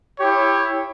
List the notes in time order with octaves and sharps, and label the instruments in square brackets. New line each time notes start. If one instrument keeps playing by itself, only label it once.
[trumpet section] E4 G4 C#5